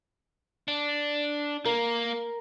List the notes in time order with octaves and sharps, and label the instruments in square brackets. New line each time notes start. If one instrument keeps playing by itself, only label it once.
[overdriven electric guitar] D4
[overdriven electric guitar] A#3 [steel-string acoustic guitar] A#4